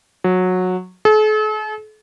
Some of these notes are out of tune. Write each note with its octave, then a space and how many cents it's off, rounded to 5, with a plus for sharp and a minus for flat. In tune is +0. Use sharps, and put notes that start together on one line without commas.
F#3 -15
A4 -45